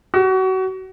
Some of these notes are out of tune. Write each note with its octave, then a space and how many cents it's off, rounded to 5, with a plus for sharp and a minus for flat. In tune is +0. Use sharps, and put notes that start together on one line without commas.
F#4 +30